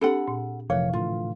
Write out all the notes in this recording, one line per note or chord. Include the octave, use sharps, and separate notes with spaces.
C4 D4 G4 A4 F#5 B5
A#2
F1 C3 E3 F3 A3 C#5 F5
A2 D3 E3 F4